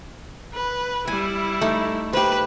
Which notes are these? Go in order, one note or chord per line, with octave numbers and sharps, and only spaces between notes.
B4
G3 E4 G#5
A3 D#4
G4 B4 C5